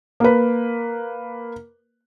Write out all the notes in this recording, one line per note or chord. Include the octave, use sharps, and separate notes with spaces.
A#3 B4